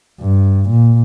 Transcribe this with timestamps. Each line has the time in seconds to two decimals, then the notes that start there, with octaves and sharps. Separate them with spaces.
0.20 G2
0.69 A#2